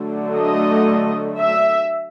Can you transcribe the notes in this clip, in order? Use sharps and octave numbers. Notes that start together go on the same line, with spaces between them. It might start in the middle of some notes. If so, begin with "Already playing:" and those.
Already playing: D3 F#3 A3
D#5
E5